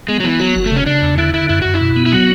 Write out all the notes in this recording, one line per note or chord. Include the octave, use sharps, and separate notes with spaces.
G#3 B3
F#3
E3 B3
F#3 F#4
F#1
A3
C#3
C#4
C#3 D4
E2
D3 E4
D3 E4
F#2 E4
F#2 F#4
E4
B2
B3
E4
F#3 F#4